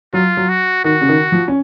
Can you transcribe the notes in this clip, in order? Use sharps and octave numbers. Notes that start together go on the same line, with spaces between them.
F#3 F4
F#3
F#4
D#3 F#4
C#3
D#3
F3
C#4